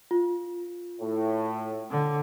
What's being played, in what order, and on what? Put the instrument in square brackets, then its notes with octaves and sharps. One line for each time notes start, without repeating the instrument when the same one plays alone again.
[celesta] F4
[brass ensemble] A2
[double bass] D3